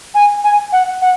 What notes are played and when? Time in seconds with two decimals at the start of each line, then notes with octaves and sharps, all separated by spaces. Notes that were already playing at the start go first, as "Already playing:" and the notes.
0.14 G#5
0.44 G#5
0.72 F#5
1.02 F#5